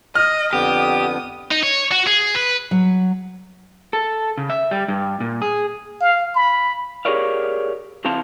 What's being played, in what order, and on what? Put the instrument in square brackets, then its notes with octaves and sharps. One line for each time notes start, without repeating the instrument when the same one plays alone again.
[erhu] D#5 [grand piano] F6
[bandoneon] F2 D3 B3 [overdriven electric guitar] G4 [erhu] D#6
[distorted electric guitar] D#4
C#5
F#4
G#4
B4
[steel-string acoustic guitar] F#3
[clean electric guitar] A4
C#3
E5
G3
G2
A#2
G#4
[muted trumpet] F5
B5
[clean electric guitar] G4 G#4 A#4 C#5 D5 F5
C3 E3 C4 F5 A5 C6